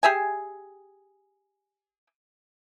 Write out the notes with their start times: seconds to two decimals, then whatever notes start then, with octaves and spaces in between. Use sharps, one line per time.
0.03 G4 G#4 E5 G#5